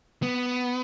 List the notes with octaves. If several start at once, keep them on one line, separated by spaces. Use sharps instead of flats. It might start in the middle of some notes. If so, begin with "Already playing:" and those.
B3